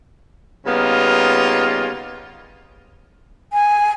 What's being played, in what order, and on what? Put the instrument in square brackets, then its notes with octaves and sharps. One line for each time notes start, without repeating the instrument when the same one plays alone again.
[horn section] C#3 G3 A#3 B3 D#4 F4
[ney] G#5